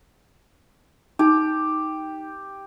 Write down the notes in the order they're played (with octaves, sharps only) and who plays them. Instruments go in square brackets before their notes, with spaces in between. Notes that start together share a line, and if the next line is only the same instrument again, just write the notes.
[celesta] D#4 [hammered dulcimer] G4